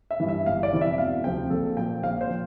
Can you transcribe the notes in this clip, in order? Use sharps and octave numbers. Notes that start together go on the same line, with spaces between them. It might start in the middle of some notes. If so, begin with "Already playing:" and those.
E5
G2 E3
E5
G1 F5
D5
F2 C3 E3
E5
E1 F5
D2 C3 F3 G5
A#1 A4
A#2 F3 G5
A#1 F5
C5
A#2 F3